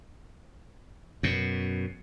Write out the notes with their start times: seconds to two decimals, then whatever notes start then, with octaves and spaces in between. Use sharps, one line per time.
1.23 F#2 B2